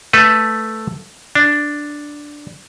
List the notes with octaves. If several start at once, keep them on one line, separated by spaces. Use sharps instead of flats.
A3 A4 B4
D4